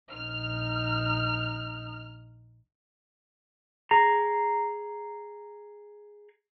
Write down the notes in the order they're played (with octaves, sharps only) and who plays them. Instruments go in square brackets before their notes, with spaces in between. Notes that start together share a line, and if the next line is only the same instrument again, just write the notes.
[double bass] A#1 D#4 [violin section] F6
[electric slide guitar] G#4 A#5